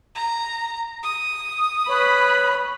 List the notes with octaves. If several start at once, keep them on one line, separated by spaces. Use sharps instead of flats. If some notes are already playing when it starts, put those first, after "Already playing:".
A#5
D#6
B4 C#5 B5